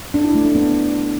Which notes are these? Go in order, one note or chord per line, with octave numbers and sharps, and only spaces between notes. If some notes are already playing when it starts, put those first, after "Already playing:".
D4
E4
A3
D4
B3